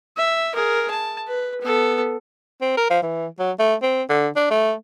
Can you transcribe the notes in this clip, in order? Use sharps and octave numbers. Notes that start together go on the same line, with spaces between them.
E5
G#4 A#4
A5
B4
B3 A4
C4
A#4
F3
E3
F#3
A3
C4
D3
D4
A3